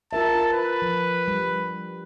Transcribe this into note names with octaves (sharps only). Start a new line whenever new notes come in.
F4 A#4 E5 A5
B4
F3
G3